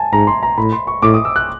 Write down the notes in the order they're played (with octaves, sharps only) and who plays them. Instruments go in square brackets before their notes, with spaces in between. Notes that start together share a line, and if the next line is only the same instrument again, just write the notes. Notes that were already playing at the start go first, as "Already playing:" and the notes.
Already playing: [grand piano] G#5 A5
[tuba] G#2 [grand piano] A#5
[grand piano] C6
A#5
[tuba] A2 [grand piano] B5
[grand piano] C6
C#6
[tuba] A2 [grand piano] D6
[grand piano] D#6
E6
F#6